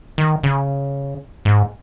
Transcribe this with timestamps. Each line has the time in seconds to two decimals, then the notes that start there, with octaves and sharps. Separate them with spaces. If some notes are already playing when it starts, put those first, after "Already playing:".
0.18 D#3
0.43 C#3
1.45 G#2